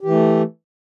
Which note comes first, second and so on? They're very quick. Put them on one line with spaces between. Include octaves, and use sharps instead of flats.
G4 E3 A3